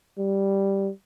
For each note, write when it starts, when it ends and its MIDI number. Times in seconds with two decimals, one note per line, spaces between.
0.18 0.91 55